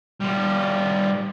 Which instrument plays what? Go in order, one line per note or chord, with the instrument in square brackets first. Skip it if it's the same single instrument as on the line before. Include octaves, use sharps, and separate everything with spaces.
[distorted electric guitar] G3 F4